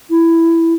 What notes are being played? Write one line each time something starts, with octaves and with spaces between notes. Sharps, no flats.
E4